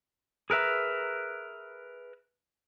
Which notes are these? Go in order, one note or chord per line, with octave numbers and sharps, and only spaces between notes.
G#4 A#4 B4 E5 A#5